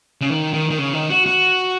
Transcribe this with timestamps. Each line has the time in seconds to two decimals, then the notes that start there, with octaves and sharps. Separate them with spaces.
0.21 C#3
0.30 D#3
0.54 D#3
0.70 D#3
0.78 C#3
0.93 D#3
1.10 F#4
1.26 F#4